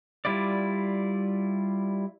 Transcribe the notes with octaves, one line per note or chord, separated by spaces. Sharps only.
G3 E4 F4 D5